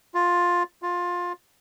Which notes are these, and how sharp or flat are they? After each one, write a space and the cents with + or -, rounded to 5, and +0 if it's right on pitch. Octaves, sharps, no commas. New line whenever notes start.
F4 +10
F4 +15